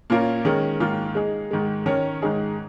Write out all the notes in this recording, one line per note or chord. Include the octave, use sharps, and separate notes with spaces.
A#2 A#3 C#4 F4 A#4
D#3 G#3 C#4 A#4
G#2 D#3 A#3 F4
G#3 D#4 G#4
G#2 D#3 G#3
D#3 C#4 A#4 C#5
G#2 D#3 G#3 D#4 G#4